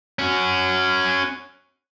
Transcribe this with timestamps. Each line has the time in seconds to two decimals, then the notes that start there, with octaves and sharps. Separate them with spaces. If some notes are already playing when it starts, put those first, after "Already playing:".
0.19 C#4 F#4